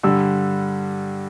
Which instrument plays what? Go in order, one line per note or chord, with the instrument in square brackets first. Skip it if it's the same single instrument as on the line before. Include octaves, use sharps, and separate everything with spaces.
[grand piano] G2 D3 G3 E6